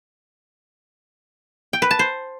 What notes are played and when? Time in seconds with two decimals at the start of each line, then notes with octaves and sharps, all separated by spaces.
1.73 G5
1.82 B4
1.91 A5
1.99 C5